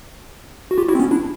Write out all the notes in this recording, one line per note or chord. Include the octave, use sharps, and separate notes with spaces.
F#4
F4 G4
E4 F#4
C4
B3 C#4
D4 E4